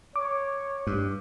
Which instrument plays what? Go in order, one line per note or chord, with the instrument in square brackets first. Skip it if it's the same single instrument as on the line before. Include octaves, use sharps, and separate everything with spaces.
[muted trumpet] C#5 [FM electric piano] D6
[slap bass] G2